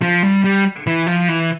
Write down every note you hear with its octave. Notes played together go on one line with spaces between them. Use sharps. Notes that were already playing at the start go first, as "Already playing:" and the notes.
F3
G3
G3
E3
F3
E3